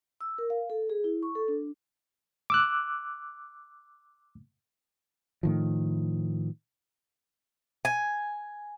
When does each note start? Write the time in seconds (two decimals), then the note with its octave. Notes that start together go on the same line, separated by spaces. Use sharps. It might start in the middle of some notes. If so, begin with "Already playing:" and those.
0.21 E6
0.38 A#4
0.50 F5
0.70 A4
0.90 G#4
1.04 E4
1.23 C#6
1.35 A4
1.48 D4
2.50 D6 E6 F#6
5.43 A2 D#3 F3
7.85 G#5